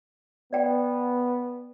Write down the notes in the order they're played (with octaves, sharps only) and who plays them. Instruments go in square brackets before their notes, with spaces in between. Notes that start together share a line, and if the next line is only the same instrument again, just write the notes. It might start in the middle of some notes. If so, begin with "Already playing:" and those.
[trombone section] B3 [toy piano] D5 G5